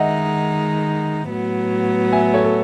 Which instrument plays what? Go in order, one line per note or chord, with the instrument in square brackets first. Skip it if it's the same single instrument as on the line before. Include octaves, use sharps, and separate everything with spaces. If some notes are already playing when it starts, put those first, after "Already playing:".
Already playing: [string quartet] D#3 G#3 D#4 [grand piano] D#5 E5 F#5
[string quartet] A2 F#3 B3
[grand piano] E5 G#5
A4 C#5
A4